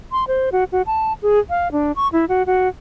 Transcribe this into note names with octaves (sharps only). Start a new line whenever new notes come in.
C6
C5
F#4
F#4
A5
G#4
F5
D4
C#6
E4
F#4
F#4